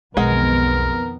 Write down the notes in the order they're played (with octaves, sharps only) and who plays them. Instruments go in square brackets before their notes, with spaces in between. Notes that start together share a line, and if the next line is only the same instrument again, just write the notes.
[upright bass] B1 [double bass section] F2 D#3 B3 [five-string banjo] G#3 F#5 [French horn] A#4